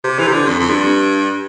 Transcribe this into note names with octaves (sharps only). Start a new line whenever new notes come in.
C3
E3
C3
D3
F2
F2
G2